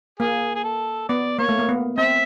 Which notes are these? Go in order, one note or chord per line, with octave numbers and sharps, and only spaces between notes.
A#3 G#4
G#4
A4
B3 D5
A#3 C#5
A3
A#3
B3
C4 E5